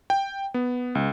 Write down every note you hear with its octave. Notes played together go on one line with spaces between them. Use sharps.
G5
B3
C#2